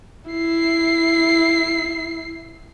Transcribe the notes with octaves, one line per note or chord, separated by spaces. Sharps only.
E4 C7